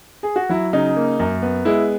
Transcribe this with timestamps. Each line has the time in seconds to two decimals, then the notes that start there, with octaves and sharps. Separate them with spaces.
0.23 G#4
0.36 F#4
0.49 F#3 E4
0.73 C#3 D#4
0.96 A#3
1.19 F#2
1.42 B3
1.65 G#3 E4